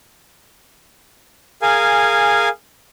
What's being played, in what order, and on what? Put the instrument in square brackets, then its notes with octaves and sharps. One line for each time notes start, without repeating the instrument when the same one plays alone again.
[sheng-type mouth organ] G#4 A#4 F5 G#5